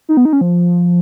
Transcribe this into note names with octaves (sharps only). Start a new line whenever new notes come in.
D#4
B3
D#4
C#4
F3